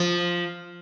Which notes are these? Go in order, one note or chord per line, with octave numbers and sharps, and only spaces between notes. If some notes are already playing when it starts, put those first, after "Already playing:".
Already playing: F3